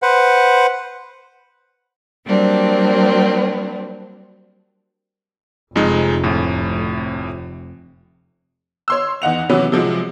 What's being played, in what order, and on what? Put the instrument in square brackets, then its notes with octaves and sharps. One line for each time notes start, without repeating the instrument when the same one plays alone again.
[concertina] B4 C5 F#5
[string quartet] F#3 G3 A#3 C4 D4
[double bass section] F1 C3 [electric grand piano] F2 G#3 D#4
[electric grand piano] D2 A2
[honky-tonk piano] C#5 C6 E6
E2 D#4 F#5 F7
C3 E3 F#3 B3 C#4
C3 F3 F#3 G#3